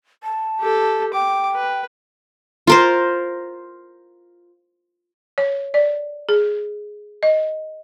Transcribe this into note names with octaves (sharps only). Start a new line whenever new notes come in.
A5
G4 A4
G5 D6
B4
F4 A#4 C5
C#5
D5
G#4
D#5